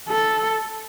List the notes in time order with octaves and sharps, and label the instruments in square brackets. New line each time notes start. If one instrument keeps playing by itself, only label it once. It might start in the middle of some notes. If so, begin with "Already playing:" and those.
[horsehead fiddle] A4